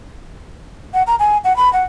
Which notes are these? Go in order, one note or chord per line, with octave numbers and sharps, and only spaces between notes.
F#5
A#5
G#5
F#5
B5
F#5